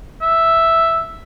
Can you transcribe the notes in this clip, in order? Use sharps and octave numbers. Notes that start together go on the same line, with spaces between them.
E5